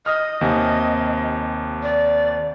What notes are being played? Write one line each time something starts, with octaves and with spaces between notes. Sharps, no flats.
D#5 D#6 F6
D#2 C3 G#5
D5